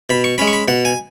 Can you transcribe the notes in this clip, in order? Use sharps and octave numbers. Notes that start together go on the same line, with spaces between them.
B2 B5
C#6
G#3 C#4 B5
C#6
B5
B2 F#5
G#5